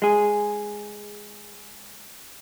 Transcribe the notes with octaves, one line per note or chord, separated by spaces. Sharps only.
G#3 G#4